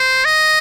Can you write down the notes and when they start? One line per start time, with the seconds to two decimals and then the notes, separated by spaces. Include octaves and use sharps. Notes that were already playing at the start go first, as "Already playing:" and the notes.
Already playing: C5
0.25 D#5